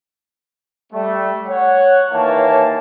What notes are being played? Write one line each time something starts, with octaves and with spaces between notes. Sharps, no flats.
G3 A3
C#5 F#5
D#2 E3 A#3 C#5 A5